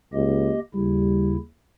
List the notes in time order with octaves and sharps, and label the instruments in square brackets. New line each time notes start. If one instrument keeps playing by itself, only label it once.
[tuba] C#2 [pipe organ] A#3 G4 D#5
[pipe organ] D#2 C#3 E4 [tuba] G3